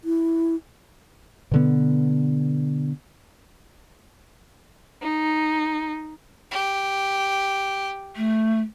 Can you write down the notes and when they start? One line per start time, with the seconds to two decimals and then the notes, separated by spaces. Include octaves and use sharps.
0.04 E4
1.51 B2 D3 B3
5.02 D#4
6.51 G4
8.16 A3